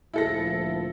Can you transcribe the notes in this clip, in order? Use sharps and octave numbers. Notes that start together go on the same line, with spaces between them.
D2 A#2 F3 E4 A4 A#6